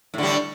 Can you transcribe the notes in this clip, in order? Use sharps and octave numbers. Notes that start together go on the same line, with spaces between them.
A2 D3 G3